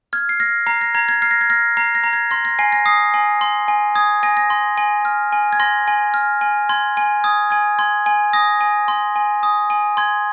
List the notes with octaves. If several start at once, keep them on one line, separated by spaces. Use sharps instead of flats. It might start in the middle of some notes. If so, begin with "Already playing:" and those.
F6 G#6
C7
F6 A#6
A#5 C7
A#6
A#5 G#6
G#6
F6 C7
A#6
G#6
F6 A#6
A#5 C7
A#6
A#5
G#6
C6 A#6
A#6
G#5 C7
A#6
D#6 C7
G#5
C6
G#5
D#6 G#6
G#5 A#6
A#6
C6
G#5
F6
G#5
G#6
C6 A#6
G#5
F6
G#5
C6 G#6
G#5
D#6 G#6
G#5 G#6
C6 G#6
G#5
D#6 A#6
G#5
C6
G#5
D#6
G#5
C6 G#6